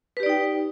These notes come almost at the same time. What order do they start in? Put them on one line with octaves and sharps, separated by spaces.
B4 G4 D5 D#4 G5